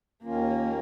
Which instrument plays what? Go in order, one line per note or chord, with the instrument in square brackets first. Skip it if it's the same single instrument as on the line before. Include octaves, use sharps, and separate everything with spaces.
[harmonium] D#2 D#3 C#4 F4 [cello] A#3